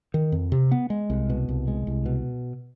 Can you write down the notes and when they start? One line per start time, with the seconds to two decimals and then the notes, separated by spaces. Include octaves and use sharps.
0.14 D#3
0.32 F2
0.52 C3
0.72 B3
0.90 G#3
1.10 C2
1.30 B2
1.48 C2
1.68 G#3
1.87 C2
2.06 B2